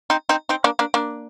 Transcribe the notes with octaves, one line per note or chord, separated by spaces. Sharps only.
C4 D#4
C4 D#4
C4 D#4
A#3 D4
A#3 D4
A#3 D4